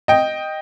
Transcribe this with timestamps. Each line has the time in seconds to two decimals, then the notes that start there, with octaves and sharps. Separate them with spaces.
0.08 D#5 G5